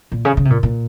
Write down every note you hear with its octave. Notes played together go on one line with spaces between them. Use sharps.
A#2
C#3
C#3
C3
A#2
A#2